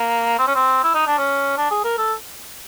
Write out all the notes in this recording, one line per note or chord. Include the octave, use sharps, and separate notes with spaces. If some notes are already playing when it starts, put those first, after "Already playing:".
Already playing: A#3
C4
C#4
C4
E4
D#4
D4
C#4
D4
G#4
A#4
A4